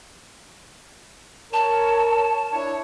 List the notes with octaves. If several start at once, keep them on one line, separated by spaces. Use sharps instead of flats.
A#4 C#5 A5
D4 E4 C#5